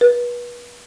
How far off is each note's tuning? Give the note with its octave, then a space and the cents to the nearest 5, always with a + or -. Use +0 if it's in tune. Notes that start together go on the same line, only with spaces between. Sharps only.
B4 -30